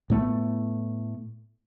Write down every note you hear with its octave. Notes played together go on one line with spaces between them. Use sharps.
A2 A3 B3